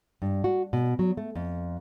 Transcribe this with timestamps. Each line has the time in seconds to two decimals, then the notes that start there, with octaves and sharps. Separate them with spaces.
0.22 G2
0.44 F#4
0.73 B2
0.99 F#3
1.17 A3
1.35 F2